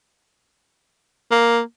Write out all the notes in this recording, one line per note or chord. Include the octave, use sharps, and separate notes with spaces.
A#3